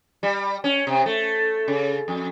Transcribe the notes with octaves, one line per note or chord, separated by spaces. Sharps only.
G3
C#4
C3
A3
C#3
F2